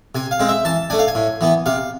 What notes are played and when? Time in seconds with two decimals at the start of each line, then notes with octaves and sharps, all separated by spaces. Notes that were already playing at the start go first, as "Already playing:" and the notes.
0.15 C3 G#5
0.31 F5
0.40 G#3 C4
0.49 E5
0.65 E3 A5
0.90 A3 D4 G#5
0.99 F5
1.08 G#5
1.15 A2
1.41 E3 B3
1.66 C3 F5